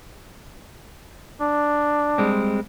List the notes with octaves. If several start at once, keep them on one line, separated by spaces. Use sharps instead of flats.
D4
G3 G#3 C4